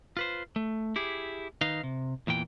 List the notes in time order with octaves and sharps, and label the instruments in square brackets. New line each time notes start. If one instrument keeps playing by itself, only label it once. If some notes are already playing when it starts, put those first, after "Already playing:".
[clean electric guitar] F4 B4 C5
A3
E4 G4 G#4
D#3 D#4 B4 D#5 F5
C3
E2 A#2 E3 G5